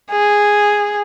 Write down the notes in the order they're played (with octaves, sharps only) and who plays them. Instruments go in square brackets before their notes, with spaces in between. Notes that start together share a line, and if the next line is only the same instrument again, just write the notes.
[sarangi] G#4